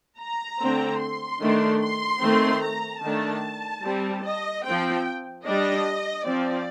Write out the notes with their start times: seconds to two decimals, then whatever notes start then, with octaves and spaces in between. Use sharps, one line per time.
0.19 A#5
0.60 D3 A3 C4
1.00 C6
1.41 D#3 A3 D4
1.81 C6
2.22 D#3 A3 C4
2.62 A#5
3.02 D#3 A3 D4 A5
3.83 G3 C4
4.23 D#5
4.64 F3 C4 G5
5.45 G3 D4 D#5
6.26 F3 C4 D5